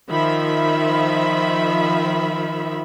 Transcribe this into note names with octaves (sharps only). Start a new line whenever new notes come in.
D#3 F3 E5 B5